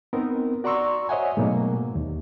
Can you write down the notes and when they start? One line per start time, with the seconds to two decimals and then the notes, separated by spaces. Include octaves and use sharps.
0.13 B3 C4 D#4 A#4
0.64 F#4 D5 A#5 C6 C#6 E6
1.09 C5 C#5 D#5 E5 F#5 G#5
1.37 G#2 B2 F#3 A3 A#3
1.96 D#2